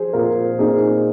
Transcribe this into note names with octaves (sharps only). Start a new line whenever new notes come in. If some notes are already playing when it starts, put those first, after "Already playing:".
Already playing: F3 G#4 C5
A#2 F4 A#4
A#2 D#4 G#4